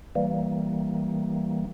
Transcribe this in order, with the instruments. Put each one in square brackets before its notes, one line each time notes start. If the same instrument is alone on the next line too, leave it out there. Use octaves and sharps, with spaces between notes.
[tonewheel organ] E3 G3 A#3